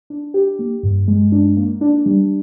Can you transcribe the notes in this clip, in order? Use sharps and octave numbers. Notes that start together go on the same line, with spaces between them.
D4
G4
A#3
G2
G#3
D4
A#3
D4
G3